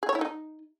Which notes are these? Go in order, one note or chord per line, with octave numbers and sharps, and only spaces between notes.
G#4
C#5
E4
D#4